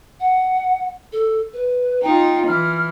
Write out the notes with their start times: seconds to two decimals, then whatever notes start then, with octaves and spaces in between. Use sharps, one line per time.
0.20 F#5
1.12 A4
1.54 B4
2.03 D#4 F4 G5
2.47 E3 F6